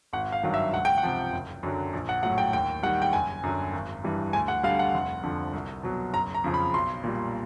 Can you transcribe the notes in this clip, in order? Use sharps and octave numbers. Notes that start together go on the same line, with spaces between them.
G#1 F#5
F5
G2 D#3 F#3
E5
C#2 F#5
G5
F#5
C3 F3
F#1
F#2 D3 F#3
A#1
F#5
A2 F#3 F#5
G5
D#2 G5
D#3 G3 F#5
G5
F#1 G#5
F#2 D3 F#3
G#1
G2 E3 G3
D2 G#5
F#5
D3 G3 F5
F#5
F1
F2 D3 F3
C2
B2 F#3
F#1 A#5
A#5
F2 C#3 F3
B5
B1 C6
A#2 G3